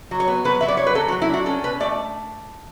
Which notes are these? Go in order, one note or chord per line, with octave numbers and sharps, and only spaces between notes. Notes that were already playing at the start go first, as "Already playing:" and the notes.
F#3
C#5
B3
F#3 B4
F#3 E5
D5
F#3 C#5
B4
F#3 A4
F#4
F#3
E4
D4 F#4
C#4 A4
B2 B4
A3 D5